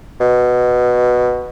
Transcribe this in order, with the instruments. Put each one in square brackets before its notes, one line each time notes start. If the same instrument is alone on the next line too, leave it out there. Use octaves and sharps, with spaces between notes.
[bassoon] B2